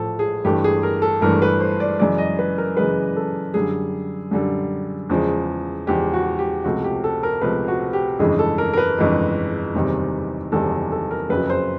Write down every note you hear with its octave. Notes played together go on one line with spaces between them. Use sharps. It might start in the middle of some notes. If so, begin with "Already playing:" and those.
Already playing: A1 A2 F3 A4
G#4
G1 G2 E3 A3 G4
G#4
A#4
A4
G1 G2 E3 A3 A#4
B4
C5
D5
F#2 C#3 E3 G#3 D5
D#5
B4
A#4
F#2 C#3 E3 G#3 B4
A4
F#2 D3 G3 G#4
F#2 D3 G3
E2 C#3 F3 G#3
E2 C#3 F3 G#3 G4
F#4
G4
C#2 C3 F3 A3 F#4
G4
A4
A#4
C#2 C3 F3 A3 B4
F#4
G4
G1 F2 C#3 E3 G#3 G#4
A4
A#4
A#4
B4
G1 F2 C#3 E3 G#3
F#1 E2 C3 D#3 G3
F#1 E2 C3 D#3 G3 A4
A4
A#4
F#1 F2 C#3 F#3 B4
C5